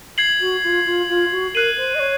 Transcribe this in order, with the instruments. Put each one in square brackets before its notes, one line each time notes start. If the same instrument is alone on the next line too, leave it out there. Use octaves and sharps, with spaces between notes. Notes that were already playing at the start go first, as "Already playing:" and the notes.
[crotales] G#6 C7 F#7
[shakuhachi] F#4
F4
F4
F4
F#4
[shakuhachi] A#4 [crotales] F#6 C7 D#7 F#7
[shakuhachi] C5
D#5
C#5